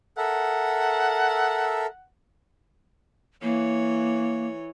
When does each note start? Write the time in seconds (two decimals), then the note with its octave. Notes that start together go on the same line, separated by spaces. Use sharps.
0.17 A4 A#4 E5 F#5
3.43 E3 A#3 C#5